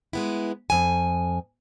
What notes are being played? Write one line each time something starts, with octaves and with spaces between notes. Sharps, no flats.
G#3 B3 E4
F2 G#5